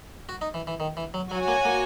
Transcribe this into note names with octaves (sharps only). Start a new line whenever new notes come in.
F#4
D#4
E3
E3
D#3
E3
F#3
F#3 F#4 C#5 G#5
A#3
A#3